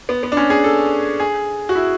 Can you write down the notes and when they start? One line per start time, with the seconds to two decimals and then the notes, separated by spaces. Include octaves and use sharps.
0.09 B3
0.23 B3
0.32 D4
0.37 C#4
0.50 G#4
0.64 A4
1.20 G#4
1.69 F#4
1.75 E4